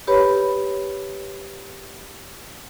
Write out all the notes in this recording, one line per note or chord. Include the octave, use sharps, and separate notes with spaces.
G4 B4 C#5 B5